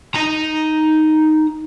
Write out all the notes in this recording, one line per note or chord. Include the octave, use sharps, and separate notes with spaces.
D#4 A#5